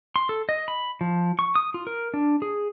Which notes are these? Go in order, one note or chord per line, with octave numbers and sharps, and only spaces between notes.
C6
A4
D#5
B5
F3
C#6
D#6
F4
A#4
D4
G#4